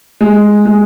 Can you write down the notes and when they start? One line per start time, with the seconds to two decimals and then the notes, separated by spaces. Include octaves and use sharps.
0.21 G#3
0.65 G#3